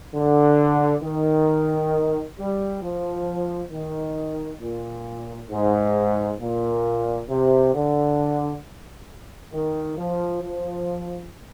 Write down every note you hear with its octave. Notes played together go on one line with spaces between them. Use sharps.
D3
D#3
G3
F3
D#3
A#2
G#2
A#2
C3
D3
D#3
F3
F3